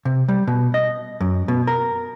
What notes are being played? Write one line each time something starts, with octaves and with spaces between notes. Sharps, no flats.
C3
G3
B2
D#5
F#2
B2
A#4